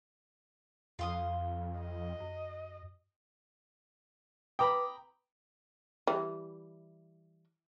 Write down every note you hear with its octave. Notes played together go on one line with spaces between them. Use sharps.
F2 F5 C6 D#6
D#5
F#2
B4 G5 A#5 B5 D6 D#6
E3 G3